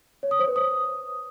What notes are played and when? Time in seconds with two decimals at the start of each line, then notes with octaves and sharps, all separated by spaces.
0.23 C#5
0.31 D#6
0.39 C5
0.48 B4
0.56 D#6